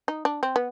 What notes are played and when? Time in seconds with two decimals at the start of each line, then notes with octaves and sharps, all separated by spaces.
0.08 D#4
0.25 D4
0.43 C4
0.56 B3